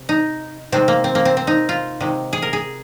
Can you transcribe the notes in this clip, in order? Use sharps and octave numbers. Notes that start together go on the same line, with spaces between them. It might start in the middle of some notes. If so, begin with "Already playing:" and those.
Already playing: C3
D#4
C3 D#3 G#3 C4
A#3
C4
A#3
C4
C4
D#4
F4
C3 D#3 G#3
G#4
A#4
G#4